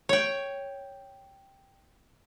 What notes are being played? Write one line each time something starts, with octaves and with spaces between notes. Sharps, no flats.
C#5 G5